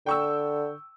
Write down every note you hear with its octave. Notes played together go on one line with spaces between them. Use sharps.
D3 G5 C#6 E6